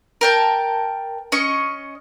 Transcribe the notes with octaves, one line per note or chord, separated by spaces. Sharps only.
A#4 G5 A5
C#4 D#5 C#6